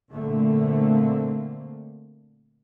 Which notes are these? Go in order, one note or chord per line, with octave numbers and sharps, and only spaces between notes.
A#2 D3 A3 A#3 C4